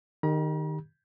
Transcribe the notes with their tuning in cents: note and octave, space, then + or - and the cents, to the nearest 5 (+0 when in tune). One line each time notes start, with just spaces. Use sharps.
D#3 -15 G4 +20 A#5 +45